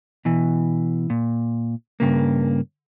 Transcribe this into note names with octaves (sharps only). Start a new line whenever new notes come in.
B2 E3
A#2
G2 C#3 A#3